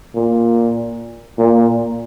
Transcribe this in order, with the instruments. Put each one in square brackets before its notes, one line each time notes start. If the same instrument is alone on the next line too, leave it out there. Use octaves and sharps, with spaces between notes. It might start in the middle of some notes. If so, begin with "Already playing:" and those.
[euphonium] A#2
A#2